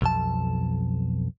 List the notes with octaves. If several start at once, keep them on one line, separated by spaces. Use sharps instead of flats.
B1 F2 A5